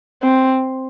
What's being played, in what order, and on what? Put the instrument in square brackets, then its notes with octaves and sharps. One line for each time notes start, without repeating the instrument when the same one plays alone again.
[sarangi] C4